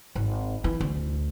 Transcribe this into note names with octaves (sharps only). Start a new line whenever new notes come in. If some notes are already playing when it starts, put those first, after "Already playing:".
G#1
E3
D2